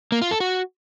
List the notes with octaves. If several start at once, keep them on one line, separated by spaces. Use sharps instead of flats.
A#3
F4
A4
F#4